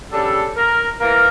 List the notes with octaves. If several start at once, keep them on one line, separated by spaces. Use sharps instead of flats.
C#3 G3 D4 A4
A#4
E3 A#3 A#4